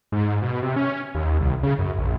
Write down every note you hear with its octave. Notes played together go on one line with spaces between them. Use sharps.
G#2
B2
C3
C#4
D#2
C2
C#3
F#2
A#1